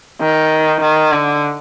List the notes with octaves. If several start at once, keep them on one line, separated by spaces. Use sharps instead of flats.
D#3
D#3
D3